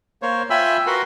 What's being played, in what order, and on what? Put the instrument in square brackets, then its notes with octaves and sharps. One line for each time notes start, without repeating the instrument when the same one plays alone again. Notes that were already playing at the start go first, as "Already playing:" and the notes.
[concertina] A#3 C5 C#5
F4 E5 G5 G#5 B5 E6
F#4 A#4 B4 F#5 C6